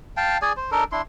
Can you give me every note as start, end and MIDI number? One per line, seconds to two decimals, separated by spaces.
0.17 0.38 77
0.17 0.38 79
0.17 0.38 81
0.42 0.53 68
0.42 0.53 74
0.42 0.53 80
0.57 0.70 72
0.71 0.84 62
0.71 0.84 63
0.71 0.84 69
0.71 0.84 70
0.92 1.02 62
0.92 1.02 64
0.92 1.02 84